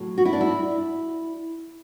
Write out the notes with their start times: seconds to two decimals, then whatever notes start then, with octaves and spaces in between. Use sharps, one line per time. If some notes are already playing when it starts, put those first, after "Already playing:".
Already playing: A2 F#3 A3
0.18 F#4
0.25 E4
0.33 D4
0.41 E4